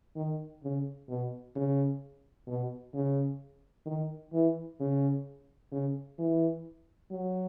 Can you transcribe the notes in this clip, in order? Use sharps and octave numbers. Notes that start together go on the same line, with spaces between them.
D#3
C#3
B2
C#3
B2
C#3
D#3
E3
C#3
C#3
E3
F#3